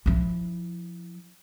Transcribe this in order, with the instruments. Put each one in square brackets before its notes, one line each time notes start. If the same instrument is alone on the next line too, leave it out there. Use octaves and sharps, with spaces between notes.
[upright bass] F3 E4